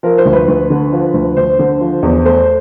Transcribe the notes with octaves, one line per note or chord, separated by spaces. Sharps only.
F3 A#4
C5
D2
B4
D2
D3
F3
D2
D2 C5
D3
F3
E2
A3 C5